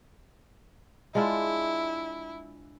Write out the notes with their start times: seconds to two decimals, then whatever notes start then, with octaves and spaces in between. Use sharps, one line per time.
1.15 G#3 D4 E4 F4